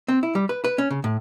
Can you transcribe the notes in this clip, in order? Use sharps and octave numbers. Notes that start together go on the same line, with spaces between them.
C4
E4
G3
B4
B4
C#4
C#3
A2